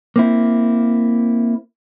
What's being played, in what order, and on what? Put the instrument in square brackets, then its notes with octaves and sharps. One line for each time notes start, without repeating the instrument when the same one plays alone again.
[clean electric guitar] A#3 C4 E4